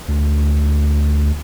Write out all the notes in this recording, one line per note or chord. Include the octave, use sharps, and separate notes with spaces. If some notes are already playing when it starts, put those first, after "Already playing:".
D2